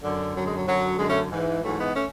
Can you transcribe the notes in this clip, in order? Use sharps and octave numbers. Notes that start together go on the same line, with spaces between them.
F#2 D3
F#2 D3 F#3
G#3
F#3
F#2 D3 F#3
F#2 D3 G#3
A3 C#4
G#2 E3
G#2 E3 F#3 A3
G#3 B3
A3 C#4